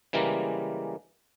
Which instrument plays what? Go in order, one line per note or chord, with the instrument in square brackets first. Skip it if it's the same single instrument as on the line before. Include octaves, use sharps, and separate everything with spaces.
[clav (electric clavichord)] C#3 E3 G3 G#3 A#3